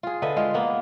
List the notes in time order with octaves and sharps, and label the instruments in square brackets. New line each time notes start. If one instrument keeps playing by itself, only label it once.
[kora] F4 G#4
D3 B4 D#5 E5
G#3 F4
A#3 B3